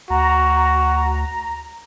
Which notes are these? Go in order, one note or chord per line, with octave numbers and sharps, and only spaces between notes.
D2 F#4 A#5